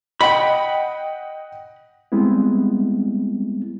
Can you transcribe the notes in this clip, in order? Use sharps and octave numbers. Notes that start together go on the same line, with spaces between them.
D#5 F#5 G5 B5
G3 G#3 B3 C4 E4